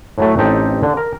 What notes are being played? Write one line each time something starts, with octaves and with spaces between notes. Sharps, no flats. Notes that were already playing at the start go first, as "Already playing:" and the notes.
A2 F#3 A3
A1 C4 D#4 G4 A4
D3
A#4